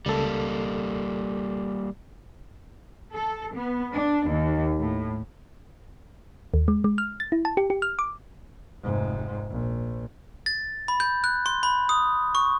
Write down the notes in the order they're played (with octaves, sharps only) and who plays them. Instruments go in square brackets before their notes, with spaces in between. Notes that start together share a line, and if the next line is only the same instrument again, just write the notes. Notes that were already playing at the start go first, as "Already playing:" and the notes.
[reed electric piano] C#2 A4 [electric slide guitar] G3 A#3
[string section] A4
B3
D4
D#2
A2
[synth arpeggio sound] D#2
G#3
G#3
F6
A6
E4
A5
G4
G4
F6
D6
[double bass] F1 G#2
A#1
[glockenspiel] A6
B5
G6
F#6
C6
B5
D#6
C#6